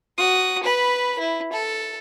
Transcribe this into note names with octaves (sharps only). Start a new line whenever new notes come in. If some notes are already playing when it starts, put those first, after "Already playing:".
F#4 D#6
B4 B5
E4
A4